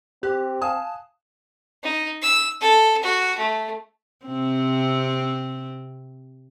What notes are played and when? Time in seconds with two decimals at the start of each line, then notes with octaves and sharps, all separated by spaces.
0.23 C4 G4 F#6
0.62 F5 G#5 A5 D#6
1.83 D#4
2.22 E6
2.61 A4
3.03 F#4
3.38 A3
4.26 C3 C4